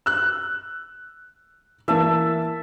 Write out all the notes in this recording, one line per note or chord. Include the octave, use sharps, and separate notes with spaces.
E6 F#6
E3 A#3 E5 A5